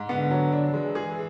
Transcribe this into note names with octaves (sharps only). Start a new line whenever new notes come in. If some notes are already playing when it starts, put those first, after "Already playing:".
Already playing: G#2
D3 B3
F#3
D4
E3 G#3
G#4